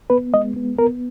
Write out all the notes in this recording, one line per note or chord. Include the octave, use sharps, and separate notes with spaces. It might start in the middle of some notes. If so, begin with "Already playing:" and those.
B3 B4
G#3 D#5
B3
B3 A#4